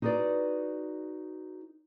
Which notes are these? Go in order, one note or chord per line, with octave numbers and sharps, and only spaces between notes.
D#4 F#4 G#4 B4 D5